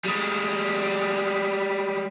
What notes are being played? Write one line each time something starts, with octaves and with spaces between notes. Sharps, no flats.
G3 G#3